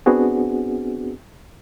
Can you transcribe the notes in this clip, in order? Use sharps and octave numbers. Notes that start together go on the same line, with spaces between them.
B3 C4 D4 F#4 G#4